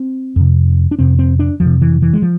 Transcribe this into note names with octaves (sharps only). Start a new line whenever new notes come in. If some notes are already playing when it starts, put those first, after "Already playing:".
Already playing: C4
F2 C3
D4
F2 C3 C4
C4
D4
F2 F3
C3
E3
E3
G#3
F3